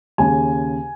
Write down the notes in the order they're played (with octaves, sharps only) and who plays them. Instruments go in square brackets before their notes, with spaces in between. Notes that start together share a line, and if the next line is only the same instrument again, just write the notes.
[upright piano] D#2 C#3 G#5